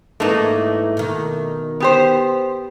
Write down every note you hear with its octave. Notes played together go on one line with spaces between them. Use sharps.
G#2 E3 A3 A#3 D#4
B2 D#3
B3 G4 C5